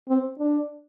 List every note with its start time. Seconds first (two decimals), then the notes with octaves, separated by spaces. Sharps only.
0.09 C4
0.39 D4